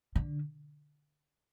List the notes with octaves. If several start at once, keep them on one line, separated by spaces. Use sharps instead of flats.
D3